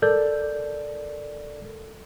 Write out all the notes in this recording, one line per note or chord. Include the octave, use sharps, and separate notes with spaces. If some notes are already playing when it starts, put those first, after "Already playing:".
A4 A#4 D5 G6